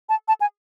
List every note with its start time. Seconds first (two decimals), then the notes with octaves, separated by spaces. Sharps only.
0.09 A5
0.28 A5
0.41 G#5